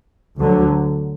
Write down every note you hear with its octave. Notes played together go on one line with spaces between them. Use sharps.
D2 D3 F#3